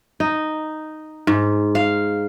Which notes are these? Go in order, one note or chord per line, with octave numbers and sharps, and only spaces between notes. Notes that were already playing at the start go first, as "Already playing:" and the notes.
D#4
G#2
F5